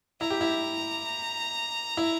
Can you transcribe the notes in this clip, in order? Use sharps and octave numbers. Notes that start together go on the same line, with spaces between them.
E4 A#5
G4
E4
E4